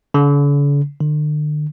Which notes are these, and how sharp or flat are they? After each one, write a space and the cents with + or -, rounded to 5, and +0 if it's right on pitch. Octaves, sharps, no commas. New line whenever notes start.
D3 -45
D3 +40